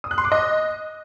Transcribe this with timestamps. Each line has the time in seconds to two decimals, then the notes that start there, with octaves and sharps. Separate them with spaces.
0.04 D#6
0.11 F#6
0.18 C6
0.25 D6
0.32 D#5